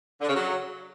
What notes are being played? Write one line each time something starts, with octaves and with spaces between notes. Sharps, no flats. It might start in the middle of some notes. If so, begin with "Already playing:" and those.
D3
C#3
F#3